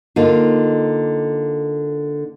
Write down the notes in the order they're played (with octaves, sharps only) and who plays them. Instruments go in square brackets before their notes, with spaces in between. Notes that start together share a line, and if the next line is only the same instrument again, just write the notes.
[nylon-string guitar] D3 A#3 D#4 F4